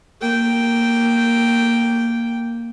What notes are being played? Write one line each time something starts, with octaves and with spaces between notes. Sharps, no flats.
A#3 G5